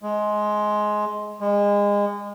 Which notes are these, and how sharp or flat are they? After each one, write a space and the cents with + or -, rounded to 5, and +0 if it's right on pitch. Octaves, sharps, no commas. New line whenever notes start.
G#3 +15
G#3 -30